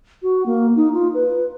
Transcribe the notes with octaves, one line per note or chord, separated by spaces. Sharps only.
F#4
A#3
D#4
F4
B4